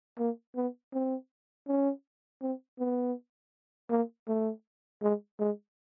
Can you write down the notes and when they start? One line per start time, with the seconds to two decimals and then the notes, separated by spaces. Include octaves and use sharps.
0.19 A#3
0.56 B3
0.93 C4
1.68 C#4
2.42 C4
2.79 B3
3.91 A#3
4.28 A3
5.02 G#3
5.39 G#3